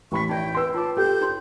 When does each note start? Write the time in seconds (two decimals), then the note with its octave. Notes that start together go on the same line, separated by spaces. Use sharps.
0.12 A1 B5 C#6 B6
0.29 D#4 D5 E5 G5
0.54 B4 E5 C6 E6
0.74 F4 C#5 A5 D6
0.97 G4 A4 G5 G6
1.21 D#4 C#5 C6